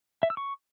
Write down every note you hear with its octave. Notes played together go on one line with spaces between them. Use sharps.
E5
E6
C#6